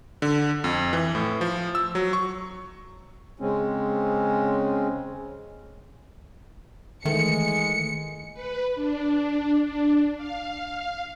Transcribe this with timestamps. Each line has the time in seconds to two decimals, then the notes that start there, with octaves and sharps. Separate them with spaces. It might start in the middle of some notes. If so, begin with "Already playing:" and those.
0.22 D3
0.64 F2
0.93 E3
1.15 A2
1.41 F3
1.75 E6
1.95 F#3
2.13 C#6
3.40 C#3 G#3 C4 C#4
7.05 D#3 E3 G#3 A3 C#7
8.34 B4
8.75 D4
9.65 D4
10.16 F5